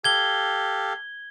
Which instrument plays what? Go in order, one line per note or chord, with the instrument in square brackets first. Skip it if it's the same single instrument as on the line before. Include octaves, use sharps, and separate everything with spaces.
[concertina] G4 A4 F5 [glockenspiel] G#6 G7